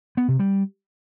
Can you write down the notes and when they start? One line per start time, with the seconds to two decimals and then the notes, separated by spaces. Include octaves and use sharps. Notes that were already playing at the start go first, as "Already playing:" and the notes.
0.17 B3
0.28 C3
0.39 G3